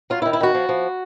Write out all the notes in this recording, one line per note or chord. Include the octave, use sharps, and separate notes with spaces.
F#3 F4
E4
D#3
E4
D#3 F#4
F3
F3